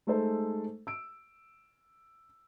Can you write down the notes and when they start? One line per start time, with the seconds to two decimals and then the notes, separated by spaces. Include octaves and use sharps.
0.07 G#3 A3 D#4 A4 C5
0.87 E6 D7